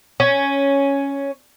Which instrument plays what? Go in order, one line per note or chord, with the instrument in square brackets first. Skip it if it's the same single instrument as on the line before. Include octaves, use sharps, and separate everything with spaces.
[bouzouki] C#4